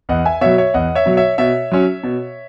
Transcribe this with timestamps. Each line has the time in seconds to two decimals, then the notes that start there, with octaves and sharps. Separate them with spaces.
0.09 E2 D#5 F#5
0.25 E5 G#5
0.41 B2 F#3 C#5 E5
0.58 C#5 E5
0.74 E2 D#5 F#5
0.95 C#5 E5
1.06 B2 F#3
1.17 C#5 E5
1.38 B2 C#5 E5
1.72 F#3 C#4
2.03 B2